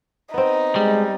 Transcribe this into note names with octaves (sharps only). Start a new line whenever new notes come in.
B3 C4 D#4
G3 G#3